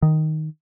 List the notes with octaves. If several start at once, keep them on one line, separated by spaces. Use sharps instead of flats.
D#3